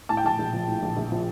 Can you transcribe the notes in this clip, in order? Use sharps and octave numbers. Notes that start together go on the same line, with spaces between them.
A2 A5
G5
A#1 A5
A#1
F3
A2
A#1
A#1
F3